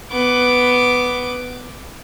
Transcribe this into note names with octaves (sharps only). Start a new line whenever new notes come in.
B3 D6